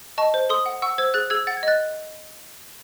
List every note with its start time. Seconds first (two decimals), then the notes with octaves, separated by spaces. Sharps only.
0.18 D#5 A5 C#6
0.34 C5
0.49 A4 C6 D#6
0.66 F#5
0.82 F#5 C#6 E6
0.98 C5 E6 G#6
1.14 G#4 F#6 A6
1.30 G#4 E6 G#6
1.47 F#5 A6
1.57 G#6
1.63 D#5 F#6 A6